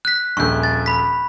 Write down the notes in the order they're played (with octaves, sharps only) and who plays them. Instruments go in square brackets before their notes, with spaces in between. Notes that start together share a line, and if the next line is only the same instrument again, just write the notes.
[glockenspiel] F#6 B6
[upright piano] D#1 A#1 [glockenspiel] C#6 G6
[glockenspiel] A6
B5 B6